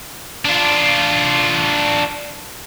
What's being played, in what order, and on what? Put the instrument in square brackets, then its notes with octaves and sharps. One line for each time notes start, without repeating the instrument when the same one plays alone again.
[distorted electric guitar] D4 F4